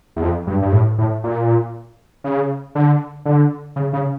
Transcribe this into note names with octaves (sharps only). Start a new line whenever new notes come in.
E2
F2
G2
G2
A2
A2
A#2
C#3
D3
D3
C#3
C#3